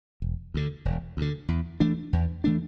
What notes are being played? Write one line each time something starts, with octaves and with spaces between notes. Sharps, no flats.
E1
D2 D3
E1
D2 D3
E2
E3 A3 D4
E2
E3 A3 D4